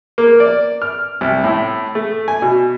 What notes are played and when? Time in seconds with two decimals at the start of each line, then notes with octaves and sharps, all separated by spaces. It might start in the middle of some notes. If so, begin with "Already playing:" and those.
0.18 A#3
0.40 D5
0.82 F6
1.21 C2
1.44 A2
1.95 A3
2.28 G#5
2.42 B2